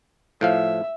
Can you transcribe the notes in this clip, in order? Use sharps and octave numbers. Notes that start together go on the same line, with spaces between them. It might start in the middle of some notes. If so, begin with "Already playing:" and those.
A2 F3 E5 F5